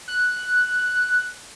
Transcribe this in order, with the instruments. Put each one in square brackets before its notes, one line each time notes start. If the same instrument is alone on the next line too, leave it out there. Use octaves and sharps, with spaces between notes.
[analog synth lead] F#6